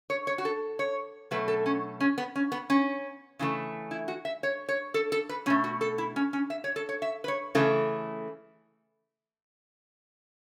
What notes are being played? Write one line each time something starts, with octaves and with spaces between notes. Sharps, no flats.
C#5
C#5
F#4
A4
C#5
B2 F#3 A3 B4
A4
C#4
C#4
B3
C#4
B3
C#4
C#3 E3 A3
E4
F#4
E5
C#5
C#5
A4
A4
B4
B2 A3 C#4
F#4
A4
E4
C#4
C#4
E5
C#5
A4
C#5
E5
B4
C#5
C#3 E3 A3 A4